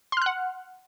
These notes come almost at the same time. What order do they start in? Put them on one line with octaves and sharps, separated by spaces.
C6 F6 F#6 F#5